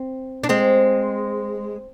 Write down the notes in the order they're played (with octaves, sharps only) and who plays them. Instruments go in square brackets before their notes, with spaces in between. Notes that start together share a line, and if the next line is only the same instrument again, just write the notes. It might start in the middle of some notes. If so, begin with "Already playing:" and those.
Already playing: [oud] C4
D4
G#3 C4